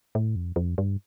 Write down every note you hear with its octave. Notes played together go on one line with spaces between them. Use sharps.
A2
F2
F2
G2